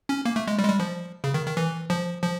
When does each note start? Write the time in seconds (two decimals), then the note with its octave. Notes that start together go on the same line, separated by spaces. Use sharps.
0.09 C#4
0.25 A#3
0.36 A3
0.48 G#3
0.59 G3
0.64 G#3
0.69 G3
0.80 F3
1.24 C#3
1.34 D#3
1.46 D#3
1.57 E3
1.90 F3
2.22 F3